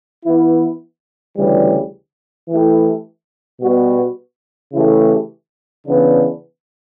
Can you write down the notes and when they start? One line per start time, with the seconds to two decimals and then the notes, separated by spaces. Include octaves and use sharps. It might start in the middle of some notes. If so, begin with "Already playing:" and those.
0.24 E3 B3 E4
1.37 D2 C#3 E3 G3
2.49 E3 A3 E4 G4
3.61 B2 G3 B3 F#4
4.72 C#3 E3 A3 E4 G4
5.85 C#3 E3 B3 D4